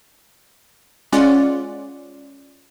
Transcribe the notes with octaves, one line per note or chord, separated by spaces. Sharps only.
G#3 C#4 F4 D5 F#5